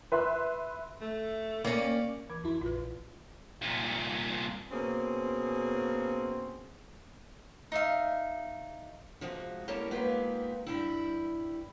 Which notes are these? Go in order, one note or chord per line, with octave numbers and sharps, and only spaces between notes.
B4 E5 C6 F#6
A3
A#3 C#4 D5
E3 D6 G#6
F2 E4 F#4 B5
A#1 F4 B4
C2 A#2
B2 A#3 C4 C#4 G#4
D#4 E5 F5
C3 F3 G#3 F#4
G3 A#3 C#4 E4 A4 A#4
G#3 A#3 B3 D#4 F4 G4
G2 G3 E4